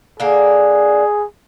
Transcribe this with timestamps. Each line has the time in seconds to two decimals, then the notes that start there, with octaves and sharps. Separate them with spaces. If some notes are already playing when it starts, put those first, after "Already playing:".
0.20 D3 A#3 G#4